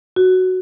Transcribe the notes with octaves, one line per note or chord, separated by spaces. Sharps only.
F#4